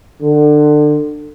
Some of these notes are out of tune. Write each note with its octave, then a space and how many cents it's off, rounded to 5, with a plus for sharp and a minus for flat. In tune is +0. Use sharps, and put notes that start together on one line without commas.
D3 +25